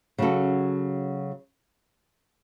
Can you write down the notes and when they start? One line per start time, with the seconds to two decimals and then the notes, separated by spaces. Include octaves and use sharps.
0.18 C#3 F#3 C#4 F#4 A4